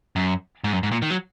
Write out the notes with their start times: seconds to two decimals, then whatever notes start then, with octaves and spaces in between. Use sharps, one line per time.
0.16 F#2
0.64 G#2
0.73 F#2
0.83 G#2
0.92 A#2
1.02 D#3
1.10 F#3